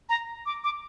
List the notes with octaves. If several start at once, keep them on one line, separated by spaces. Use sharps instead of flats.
A#5
D6
D6